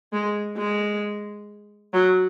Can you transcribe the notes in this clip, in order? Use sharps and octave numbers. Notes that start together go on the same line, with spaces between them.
G#3
G#3
F#3